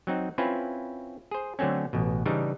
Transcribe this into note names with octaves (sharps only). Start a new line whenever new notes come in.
F#3 C4 D#4
C4 C#4 E4 F4 B4
G#4 C5
D3 F#3 A3 C4 C#4
A1 B2
C#3 E3 G3 D4 D#4